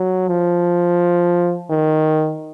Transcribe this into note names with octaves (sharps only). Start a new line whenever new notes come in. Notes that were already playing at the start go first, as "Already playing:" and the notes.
Already playing: F#3
F3
D#3